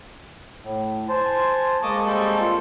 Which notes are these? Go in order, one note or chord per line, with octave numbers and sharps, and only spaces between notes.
A2
C5 G#5 A5 C6
G#3 A#3 D#5 A5 C#6 D6
G3 C4 A4
F4